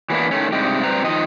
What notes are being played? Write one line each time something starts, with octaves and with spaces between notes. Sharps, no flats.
E3 F#3 A#3 B3 D4 E4
D#3 A3 C#4
G2 C3 G#3 D#4 G4
G3 C4 B4 C5 A#5
D#3 F3 D#5